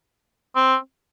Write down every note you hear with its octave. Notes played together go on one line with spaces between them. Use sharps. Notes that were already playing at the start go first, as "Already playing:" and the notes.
C4